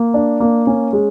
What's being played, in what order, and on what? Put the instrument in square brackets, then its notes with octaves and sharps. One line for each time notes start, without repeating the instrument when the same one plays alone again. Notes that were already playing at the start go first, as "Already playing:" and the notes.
Already playing: [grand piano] A#3
D4
A#3
C#4
G#3